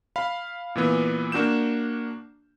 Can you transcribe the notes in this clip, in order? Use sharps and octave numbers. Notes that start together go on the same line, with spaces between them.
F5 B5
A#2 E3 B3
A#3 D4 F#4 G6 E7